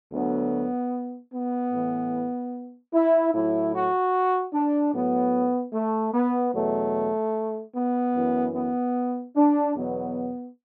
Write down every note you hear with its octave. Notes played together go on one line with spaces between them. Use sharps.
D2 D3 F#3 B3
B3
A2 E3
E4
A2 F#3 E4
F#4
D4
A2 F#3 B3
A3
B3
E2 B2 F#3 A3
B3
F#2 E3
B3
D4
E2 B2 F#3 B3